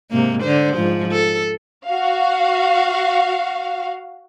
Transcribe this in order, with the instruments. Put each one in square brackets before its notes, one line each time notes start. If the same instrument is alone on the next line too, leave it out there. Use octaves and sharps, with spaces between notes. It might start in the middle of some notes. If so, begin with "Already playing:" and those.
[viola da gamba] G#2 C3 A#3
D3 C5
G#2 F3
A4
[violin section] F#4 F5